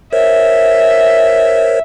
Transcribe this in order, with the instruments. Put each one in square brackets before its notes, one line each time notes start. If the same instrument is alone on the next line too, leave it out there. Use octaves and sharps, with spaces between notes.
[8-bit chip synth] A#4 C5 C#5 [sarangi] E5